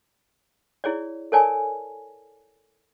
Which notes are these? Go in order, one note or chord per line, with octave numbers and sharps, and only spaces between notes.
E4 G#4 C#5 D5
A4 A#4 C#5 D5 G#5 A5